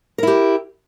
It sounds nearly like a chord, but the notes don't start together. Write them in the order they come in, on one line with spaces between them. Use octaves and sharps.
A#4 E4 G4